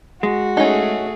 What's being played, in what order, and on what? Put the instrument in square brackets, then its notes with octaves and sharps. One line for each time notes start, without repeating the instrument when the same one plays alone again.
[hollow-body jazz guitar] G#3 [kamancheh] F#4
[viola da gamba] A3 G#4 [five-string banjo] C#4 D#4